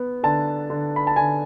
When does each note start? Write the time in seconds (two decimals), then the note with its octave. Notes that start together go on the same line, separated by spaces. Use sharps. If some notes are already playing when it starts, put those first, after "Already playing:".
Already playing: B3
0.23 D3 A5
0.70 D3
0.96 B5
1.07 A5
1.16 D3 G#5